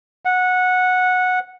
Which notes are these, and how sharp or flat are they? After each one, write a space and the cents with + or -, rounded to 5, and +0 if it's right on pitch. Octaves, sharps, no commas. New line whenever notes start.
F#5 -15